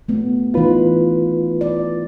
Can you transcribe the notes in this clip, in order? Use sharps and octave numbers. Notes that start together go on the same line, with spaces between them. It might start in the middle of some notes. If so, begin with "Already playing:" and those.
A3 B3
E3 D#4 F4 B4
D5